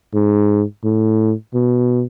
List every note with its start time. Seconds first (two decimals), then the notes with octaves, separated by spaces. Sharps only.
0.14 G#2
0.84 A2
1.54 B2